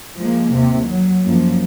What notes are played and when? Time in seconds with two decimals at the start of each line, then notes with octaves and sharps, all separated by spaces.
0.18 F3 G#3 A#3
0.53 D#2 C3
0.87 F#3
1.24 F#2 F3 A#3